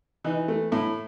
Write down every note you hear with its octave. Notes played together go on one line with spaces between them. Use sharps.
E3 D#4
A3
A2 E4